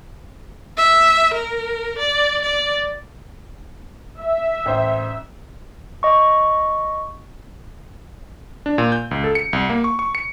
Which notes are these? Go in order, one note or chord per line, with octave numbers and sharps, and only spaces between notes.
E5
A#4
D5
D5
E5
A1 C5
D#5 C#6
D4
A#2
G6
C#2
A4
C#7
C2
A#3
C#6
C#6
C#7